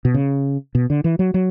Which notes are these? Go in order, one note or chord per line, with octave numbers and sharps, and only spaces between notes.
B2
C#3
B2
D3
E3
F#3
F#3